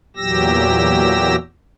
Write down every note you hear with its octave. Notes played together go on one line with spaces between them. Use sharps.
E2 A#2 F#3 G4 E6 A#6